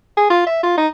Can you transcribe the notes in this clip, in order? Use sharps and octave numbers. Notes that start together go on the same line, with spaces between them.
G#4
F4
E5
F4
D#4